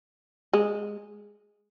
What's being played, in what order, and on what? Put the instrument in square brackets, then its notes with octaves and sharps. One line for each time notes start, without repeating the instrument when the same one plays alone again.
[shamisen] G#3